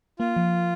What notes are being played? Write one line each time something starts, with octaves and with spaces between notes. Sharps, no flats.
A#3 F4
F3